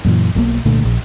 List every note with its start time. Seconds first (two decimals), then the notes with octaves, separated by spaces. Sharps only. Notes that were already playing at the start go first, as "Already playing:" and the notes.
0.05 F#2 A#2 E3
0.35 B1 B2 D3 A#3
0.65 C2 A#2 D3 A3
0.85 A#1